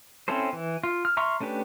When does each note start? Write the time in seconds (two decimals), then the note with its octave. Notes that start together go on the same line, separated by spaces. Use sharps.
0.28 C4 C#4 E4 A4 C5
0.53 E3
0.84 F4
1.05 F6
1.17 E5 A#5 C6 C#6 F6
1.40 A3 C#4 D4 G4 B4